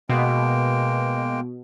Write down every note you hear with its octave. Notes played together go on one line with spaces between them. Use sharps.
B2 G#3 A#3 G5